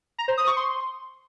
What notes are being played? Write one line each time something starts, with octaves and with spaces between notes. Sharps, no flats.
A#5
C5
D#6
C#6
C6